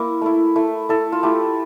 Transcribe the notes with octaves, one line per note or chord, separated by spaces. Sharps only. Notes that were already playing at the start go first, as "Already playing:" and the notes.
Already playing: A#3 E4
A3 E4
A3 E4
A3 E4 A4
F4
A3 E4 G4